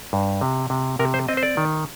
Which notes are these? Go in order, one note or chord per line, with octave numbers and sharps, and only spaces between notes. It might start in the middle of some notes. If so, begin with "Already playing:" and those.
G2
C3
C3
C3 A#4
C5
C4 D#5
C5
D5
D#3